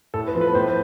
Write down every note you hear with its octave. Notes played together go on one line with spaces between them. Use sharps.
A2 A4
B4
F3 B3
B4
A2 C5